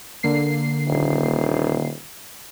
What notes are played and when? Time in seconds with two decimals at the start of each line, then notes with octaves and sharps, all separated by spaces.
0.23 D3 A#3 C7
0.88 D#1